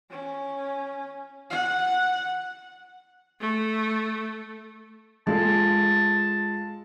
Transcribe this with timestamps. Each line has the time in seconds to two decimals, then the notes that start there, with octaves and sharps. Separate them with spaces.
0.10 C#4
1.50 F#5
3.40 A3
5.27 G#3 F4 A4 A5